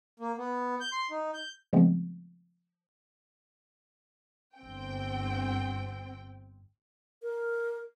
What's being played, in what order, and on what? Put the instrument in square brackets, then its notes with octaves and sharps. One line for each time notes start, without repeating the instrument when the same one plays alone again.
[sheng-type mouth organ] A#3
B3
G6
C6
D#4
G6
[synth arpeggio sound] C#3 F3 G#3 A3 B3 C4
[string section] G1 C4 G5
[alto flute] A#4